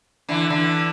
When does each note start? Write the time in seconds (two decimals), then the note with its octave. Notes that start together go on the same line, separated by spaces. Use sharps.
0.29 D3 E3
0.50 D3 E3